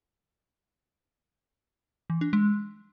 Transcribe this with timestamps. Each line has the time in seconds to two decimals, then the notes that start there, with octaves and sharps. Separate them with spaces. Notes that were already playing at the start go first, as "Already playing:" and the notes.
2.10 E3
2.21 D4
2.33 G#3